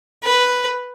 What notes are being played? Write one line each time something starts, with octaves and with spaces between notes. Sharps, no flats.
B4